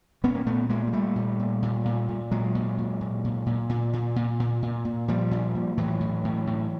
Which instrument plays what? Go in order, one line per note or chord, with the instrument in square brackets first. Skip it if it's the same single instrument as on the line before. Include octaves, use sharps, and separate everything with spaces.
[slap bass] A#2 B3 C#4
A#3
A#2 A3 B3
A#2 G#3 A#3
G#3
A#2 G3 A3
A#2
A#2
A#2
A#2
A#2
A#2 F#3 G#3
A#2
A#2
A#2
A#2
A#2
A#2
A#2
A#2
A#2
A#2
A#2
A#2 F3 G3
A#2
A#2
A2 E3 F#3
A2
A2
A2